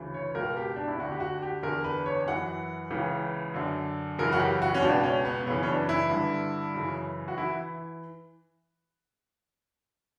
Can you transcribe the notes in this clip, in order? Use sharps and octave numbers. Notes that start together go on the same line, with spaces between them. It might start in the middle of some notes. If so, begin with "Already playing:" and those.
Already playing: D2 C#3 E3
C#5
C#2 B2 A#4
G4
D4
E4
D2 D3 F#4
G4
F#4
G4
E2 D3 A#4
B4
C#5
F#2 E3 F#5
C#2 C#3 E3
F#2 D3
F#2 C#3 E3 A#4
F#4
G4
F#4
C#4
C#2 B2 D4
C#4
B3
F#2 C#3 E3 B3
C#4
D4
E4
G2 D3
F#2 C#3 E3
F#4
E3 E4